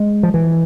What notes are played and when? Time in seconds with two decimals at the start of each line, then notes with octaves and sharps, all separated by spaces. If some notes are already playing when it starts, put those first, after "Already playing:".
Already playing: G#3
0.23 F3
0.34 E3